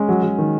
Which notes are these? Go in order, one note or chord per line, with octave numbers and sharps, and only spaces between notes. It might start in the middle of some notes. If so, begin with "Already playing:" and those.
Already playing: G#3 C#4
F#3
F#3
D#3